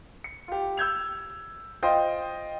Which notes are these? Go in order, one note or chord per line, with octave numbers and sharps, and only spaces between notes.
C#7
F4 G4
E6 G6 G#6 F7
F4 C5 D#5 G5 C6